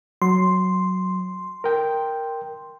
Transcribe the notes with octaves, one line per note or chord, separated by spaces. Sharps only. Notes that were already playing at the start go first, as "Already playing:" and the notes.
F#3 C6
A#4 G5